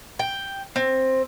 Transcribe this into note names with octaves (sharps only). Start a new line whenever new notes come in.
G5
C4